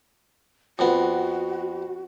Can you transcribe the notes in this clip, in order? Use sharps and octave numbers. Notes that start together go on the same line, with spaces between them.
F2 B3 F#4